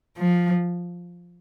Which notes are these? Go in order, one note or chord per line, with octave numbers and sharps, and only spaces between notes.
F3